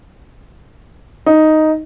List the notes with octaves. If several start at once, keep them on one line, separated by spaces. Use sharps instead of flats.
D#4